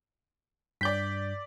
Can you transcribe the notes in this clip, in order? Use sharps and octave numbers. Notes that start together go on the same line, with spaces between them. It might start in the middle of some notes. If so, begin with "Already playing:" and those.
G2 D5 G6 B6